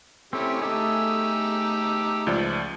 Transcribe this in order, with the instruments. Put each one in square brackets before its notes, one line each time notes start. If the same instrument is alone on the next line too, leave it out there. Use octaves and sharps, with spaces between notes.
[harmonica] A3 C#4 G4 [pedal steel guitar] C4 E4
[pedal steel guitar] A3 G#4 [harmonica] D#4 G4 E6
[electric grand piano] C#2 F3 D5